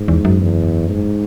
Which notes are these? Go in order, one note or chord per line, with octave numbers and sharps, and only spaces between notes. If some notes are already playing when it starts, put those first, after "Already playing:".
Already playing: G#2
E2
F#2
E2
G#2